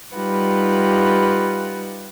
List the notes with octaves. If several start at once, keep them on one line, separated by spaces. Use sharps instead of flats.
G3 D#4 F4 G4 B4 F#5